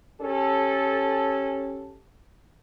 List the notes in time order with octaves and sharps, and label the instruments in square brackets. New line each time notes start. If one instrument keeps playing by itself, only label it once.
[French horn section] C#4 G4 A4